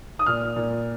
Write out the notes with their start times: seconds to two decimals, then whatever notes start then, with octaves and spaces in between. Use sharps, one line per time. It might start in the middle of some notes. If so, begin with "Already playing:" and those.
0.19 D#6
0.26 A#2 F6
0.56 A#2